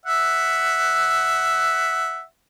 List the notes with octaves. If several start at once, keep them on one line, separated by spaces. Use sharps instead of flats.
E5 F#5